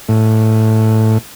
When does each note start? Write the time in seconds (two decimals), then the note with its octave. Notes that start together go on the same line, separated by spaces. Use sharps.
0.09 A2